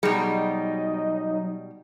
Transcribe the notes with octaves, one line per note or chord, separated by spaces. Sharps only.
B2 F#3 G3 D#4 G#4